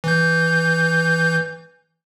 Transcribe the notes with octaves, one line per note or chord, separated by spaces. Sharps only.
E3 G6